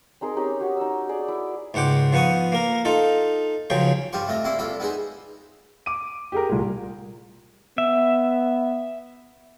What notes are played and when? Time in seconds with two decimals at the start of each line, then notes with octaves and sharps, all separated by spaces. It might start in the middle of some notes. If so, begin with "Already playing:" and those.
0.21 C4 D#4 G#4 A#4
0.37 C#4 D#4 G4
0.60 F#4 G4 C#5
0.77 D#4 E6
1.09 G#4 D5
1.28 E4
1.74 C#2 G#2 F#5 G5 D6
2.13 F3 B3 F#5 C#6 D#6
2.52 A#3 A#4
2.85 D#4 F4 A4
3.70 C#2 F3 F#3 G#4 G5
4.13 G2 F4 G4 C5 C#6
4.27 A3 C4 F4 D#5
4.44 C2 A#3 E4 B5 C6
4.59 C2 F4 A4 B5
4.80 B3 D#4 G#4 C5
5.86 D6 D#7
6.32 G4 G#4 A#4
6.49 C2 A#2
7.78 B3 E5